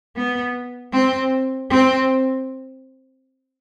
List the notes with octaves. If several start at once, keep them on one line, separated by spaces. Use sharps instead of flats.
B3
C4
C4